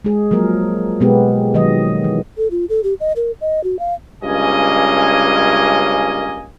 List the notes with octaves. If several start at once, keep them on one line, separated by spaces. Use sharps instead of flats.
G#3 G#4
F3 F#3 A#3 A#4
B2 G#3 B3 G4
D#3 F3 F#3 G#3 D#5
E3
A4
F4
A4
G4
D#5
A#4
D#5
F#4
F5
C#2 G2 A#3 C#4 D#5 G#5